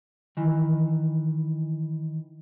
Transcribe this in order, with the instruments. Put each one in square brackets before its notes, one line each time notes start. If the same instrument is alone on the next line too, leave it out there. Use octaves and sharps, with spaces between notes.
[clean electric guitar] D#3 E3